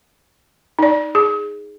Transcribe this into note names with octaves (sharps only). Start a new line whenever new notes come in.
D#4 D5
G#4